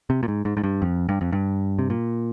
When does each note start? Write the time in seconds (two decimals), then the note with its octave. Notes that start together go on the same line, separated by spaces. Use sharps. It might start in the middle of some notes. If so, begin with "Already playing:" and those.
0.10 C3
0.23 A#2
0.28 G#2
0.45 G#2
0.57 G#2
0.64 G2
0.82 F2
1.09 G2
1.21 F2
1.32 G2
1.79 C3
1.90 A#2